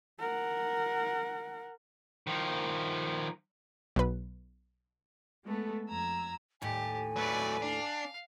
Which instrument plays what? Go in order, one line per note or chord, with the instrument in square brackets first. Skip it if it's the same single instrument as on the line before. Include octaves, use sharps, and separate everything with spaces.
[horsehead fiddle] A#4 F#5
[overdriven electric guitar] D#3 F3
[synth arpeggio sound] B1 B4
[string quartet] G#3 A3 B3 A4
F2 A#5 E6 G#6
[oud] D#2 A2 [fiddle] G4 [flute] G#5
[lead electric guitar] F#3 A3 [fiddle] B4 D5
[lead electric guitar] D4 [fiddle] F5